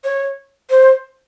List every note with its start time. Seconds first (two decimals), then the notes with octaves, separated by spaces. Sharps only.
0.04 C#5
0.70 C5